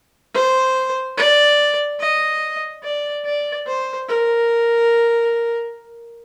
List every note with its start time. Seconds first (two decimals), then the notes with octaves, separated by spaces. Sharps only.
0.34 C5
1.18 D5
2.00 D#5
2.83 D5
3.25 D5
3.67 C5
4.08 A#4